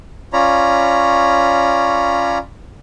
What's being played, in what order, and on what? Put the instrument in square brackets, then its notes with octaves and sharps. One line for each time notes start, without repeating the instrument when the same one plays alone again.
[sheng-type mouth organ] C#4 F4 C#5 D5 A#5 B5